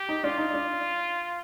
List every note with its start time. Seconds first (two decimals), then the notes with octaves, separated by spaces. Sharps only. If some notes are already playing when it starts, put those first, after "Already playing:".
Already playing: G4
0.09 D#4
0.24 D4 F4
0.38 D#4
0.53 D4